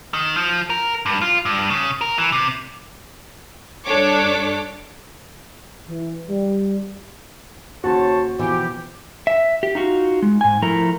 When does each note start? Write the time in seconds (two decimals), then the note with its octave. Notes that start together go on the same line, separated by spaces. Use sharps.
0.14 D#3
0.36 F3
0.70 A#4
1.06 G2
1.22 F4
1.45 G2
1.70 C#3
2.01 A#4
2.18 E3
2.32 C3
3.85 G2 D4 A4 C#5 D6
5.89 E3
6.29 G3
7.84 D#2 C#3 F#4 C5 C#5 A5 C#6
8.39 B2 E3 F3 G4
9.27 E5
9.63 G4
9.75 D#4 F4 F#4
10.22 G#3
10.41 G#2 G#5
10.62 F3 A3 E4 A#4 A#5